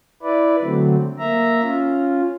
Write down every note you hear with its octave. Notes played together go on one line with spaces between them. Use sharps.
E4 B4 D5
D3 F#3 A3 C4
A#3 E5 A#5
C#4 F4